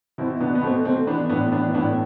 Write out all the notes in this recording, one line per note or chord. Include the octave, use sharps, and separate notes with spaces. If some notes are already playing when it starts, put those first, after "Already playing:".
B2 C4 E4
B2 B3 D4
B3
B2 A3 C4
B2 A3 C4
E3 B3 D4
A2 B3 D4
E3 B3 D4
A2 B3 D4